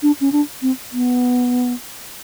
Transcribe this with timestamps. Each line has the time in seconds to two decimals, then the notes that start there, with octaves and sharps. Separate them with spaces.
0.03 D4
0.21 C#4
0.32 D4
0.62 C4
0.93 B3